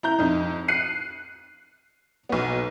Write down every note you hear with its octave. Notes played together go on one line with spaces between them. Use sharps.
E4 A#5 G6
F2 D#4
F#6 C7 C#7 D#7
B1 B3